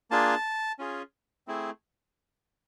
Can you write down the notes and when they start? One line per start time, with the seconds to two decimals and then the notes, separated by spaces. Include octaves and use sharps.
0.11 A#3 D4 F4 G#4 A5
0.79 C#4 F4 G#4
1.47 A3 C4 E4 G#4